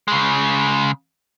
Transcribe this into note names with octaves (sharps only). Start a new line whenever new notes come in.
C#3 G#3